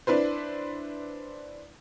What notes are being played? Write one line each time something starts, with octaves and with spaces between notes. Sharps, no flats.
D4 E4 B4 C5